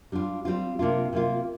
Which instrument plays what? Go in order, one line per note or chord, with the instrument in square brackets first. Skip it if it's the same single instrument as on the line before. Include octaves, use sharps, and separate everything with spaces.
[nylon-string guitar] G3 D4 F4
G3 C4 F4
C3 A#3 D4 F4
C3 A#3 F4